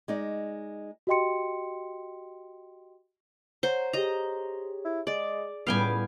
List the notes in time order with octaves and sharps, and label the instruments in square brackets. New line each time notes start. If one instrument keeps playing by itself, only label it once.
[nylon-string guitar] G#3 D#4 D5
[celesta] F#4 G4 D#5 G5 C6 C#7
[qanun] C5 [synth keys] C#5 F#5 A#5
[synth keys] G4 G#4 C#5 [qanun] D#5 A#5
[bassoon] E4
[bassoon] G#3 [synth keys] G#4 [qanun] D5
[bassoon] C#2 [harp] A2 G3 B3 [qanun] F5 G5 G#5